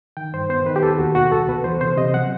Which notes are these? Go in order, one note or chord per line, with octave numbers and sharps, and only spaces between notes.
D#3 G5
G2 C5
B3 C5
D#3 B4
G4
D#2 A4
D#2 F#4
B2 F#4
C2 A4
B3 B4
E3 C5
C3 C5
C3 D#5
F#3 F#5